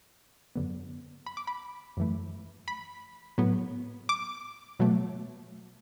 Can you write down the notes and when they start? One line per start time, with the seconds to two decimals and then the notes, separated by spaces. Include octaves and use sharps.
0.56 F#2 D3 B3
1.26 B5
1.37 D6
1.47 B5
1.97 F#2 E3 A3
2.68 B5
3.38 A2 F#3 B3
4.09 D6
4.79 B2 F#3 A3